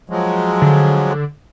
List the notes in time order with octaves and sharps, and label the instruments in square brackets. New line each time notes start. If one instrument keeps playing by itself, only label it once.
[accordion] F3 F#3 G#3
[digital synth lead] D3